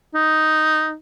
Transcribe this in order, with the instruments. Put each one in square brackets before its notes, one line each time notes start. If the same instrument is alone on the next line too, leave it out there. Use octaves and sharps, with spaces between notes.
[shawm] D#4